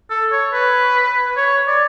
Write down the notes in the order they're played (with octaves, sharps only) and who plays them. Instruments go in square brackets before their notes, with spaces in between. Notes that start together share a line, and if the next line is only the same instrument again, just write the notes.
[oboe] A4
C#5
B4
C#5
D5